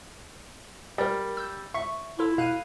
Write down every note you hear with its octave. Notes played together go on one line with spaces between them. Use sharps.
G3 A#4 D5
E6 G6
E5 C#6
E4 F4 A4
B2 F5 F#6 D#7